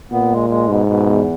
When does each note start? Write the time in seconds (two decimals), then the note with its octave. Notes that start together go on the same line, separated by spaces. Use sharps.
0.12 A#2 B3
0.31 G#3
0.50 G#3
0.68 G#2 B2
0.87 B2
1.06 E2